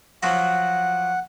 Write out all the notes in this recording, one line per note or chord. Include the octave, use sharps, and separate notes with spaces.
F3 F#3 F#4 F#5